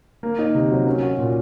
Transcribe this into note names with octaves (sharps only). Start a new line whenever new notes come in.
A#3
D#4
C3
F#3
C#4
F#4
A#2